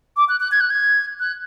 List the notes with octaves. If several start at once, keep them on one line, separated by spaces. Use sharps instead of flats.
D6
F#6
F#6
G#6
F#6
G#6
F#6